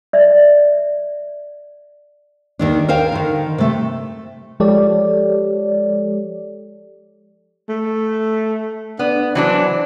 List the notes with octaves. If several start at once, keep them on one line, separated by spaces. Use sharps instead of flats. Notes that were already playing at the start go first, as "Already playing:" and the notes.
D5 E5
D#2 D#3 D4
A#4 C5 F5 G5
D3 D#3
C3 A3
F3 G#3 G4 A4 C#5 D5
A3
B3 D4
E3 F#3 D4 C5